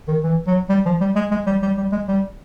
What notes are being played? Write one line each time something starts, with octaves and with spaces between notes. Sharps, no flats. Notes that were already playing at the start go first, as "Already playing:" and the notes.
D#3
E3
F#3
G3
F3
G3
G#3
G#3
G3
G3
G3
G#3
G3